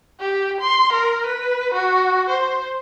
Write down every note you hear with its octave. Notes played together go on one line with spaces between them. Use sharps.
G4
C6
A#4
B4
F#4
C5